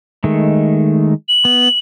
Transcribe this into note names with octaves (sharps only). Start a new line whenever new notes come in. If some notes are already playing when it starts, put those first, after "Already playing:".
D#3 G#3 A3
F#7
B3